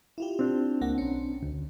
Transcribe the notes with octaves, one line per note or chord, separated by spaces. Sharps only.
E4 F4 G4
C4 D4
C#2 A#3 F#5
B1 C#4
D2